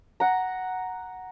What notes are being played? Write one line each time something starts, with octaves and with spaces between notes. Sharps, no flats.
F#5 A#5